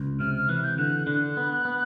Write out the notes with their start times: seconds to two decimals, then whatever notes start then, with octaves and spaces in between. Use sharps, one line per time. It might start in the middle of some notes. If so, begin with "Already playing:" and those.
Already playing: C#2
0.20 C3 F6
0.35 F6
0.49 E3 F#6
0.64 G6
0.78 D3 F#6
1.07 D3 F#6
1.37 B3
1.65 B3